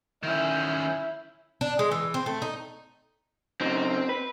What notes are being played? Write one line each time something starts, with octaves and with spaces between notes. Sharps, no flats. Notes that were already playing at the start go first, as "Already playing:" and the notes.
D#3 C#4 E4 G6
D4
G#3
E3
C4
A3
D#4
C#3 F#3 C4 D#4
B4